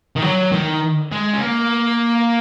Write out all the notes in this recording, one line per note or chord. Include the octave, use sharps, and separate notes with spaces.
D#3
F#3
D#3
G#3
C#4
A#3